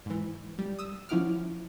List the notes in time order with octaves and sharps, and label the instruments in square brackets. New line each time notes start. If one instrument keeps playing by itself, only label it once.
[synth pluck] G#2 E3
G3
D#6 E6 E7
F3 C#4 E4 F#4 D6 F6